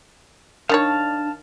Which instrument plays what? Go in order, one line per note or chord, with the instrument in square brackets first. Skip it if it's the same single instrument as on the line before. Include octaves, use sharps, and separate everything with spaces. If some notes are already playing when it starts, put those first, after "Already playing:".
[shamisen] D#3 F#4 C#5 [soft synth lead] D4 [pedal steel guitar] F5 A5